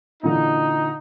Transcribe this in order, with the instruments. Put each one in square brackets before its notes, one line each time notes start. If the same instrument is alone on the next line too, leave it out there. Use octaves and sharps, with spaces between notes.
[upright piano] A#2 D3 E3 [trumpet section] D#4